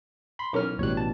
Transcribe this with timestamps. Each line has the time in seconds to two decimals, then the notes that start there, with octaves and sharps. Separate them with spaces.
0.39 B5 C6
0.53 B1 E3 C#4 A#4 F6
0.79 A1 B2 G3 C#5 F#6
0.97 A5